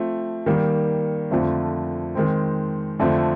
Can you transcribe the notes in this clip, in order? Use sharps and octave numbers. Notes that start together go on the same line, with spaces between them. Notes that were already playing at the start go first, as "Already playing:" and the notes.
Already playing: F3 A3 C4
D#3 G3 A#3
F2 D3 F3 A3 C4
D#3 G#3 C4
F2 D3 F3 A3 C4